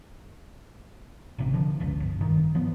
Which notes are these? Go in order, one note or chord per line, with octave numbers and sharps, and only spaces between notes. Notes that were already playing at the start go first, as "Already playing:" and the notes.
A1 C3
D3 F3
F#1 C#2
G1
D1 G#1 G2 D#3
E3 F3 B3